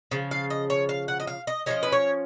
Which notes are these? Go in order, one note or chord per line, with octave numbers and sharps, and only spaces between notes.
C#3 F3
F5
D#5
C#5
F5
F#5
D#5
F5
D#5
F3 A#3 C#4 D#5
B4
C#5